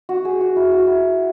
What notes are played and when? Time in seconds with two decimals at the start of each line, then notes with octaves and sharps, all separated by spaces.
0.09 F#4
0.25 G#4
0.41 F#4
0.56 E4
0.71 F#4
0.87 E4